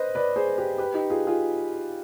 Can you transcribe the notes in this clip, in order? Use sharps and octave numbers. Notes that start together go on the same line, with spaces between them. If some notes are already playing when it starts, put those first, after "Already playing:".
Already playing: B4 C5 D#5
B4 D5
G#4 C5
G4 B4
G4 B4
D#4 G4
F4 G#4
F4 G#4